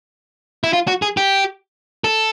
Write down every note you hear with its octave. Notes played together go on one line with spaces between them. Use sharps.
E4
F4
F#4
G#4
G4
A4